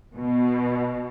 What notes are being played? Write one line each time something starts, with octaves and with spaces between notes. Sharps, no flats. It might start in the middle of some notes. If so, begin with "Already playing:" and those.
B2